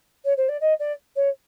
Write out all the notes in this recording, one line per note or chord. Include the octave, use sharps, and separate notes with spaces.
C#5
C5
D5
D#5
D5
C#5